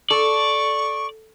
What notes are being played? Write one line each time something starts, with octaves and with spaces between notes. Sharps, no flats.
A4 D5 C#6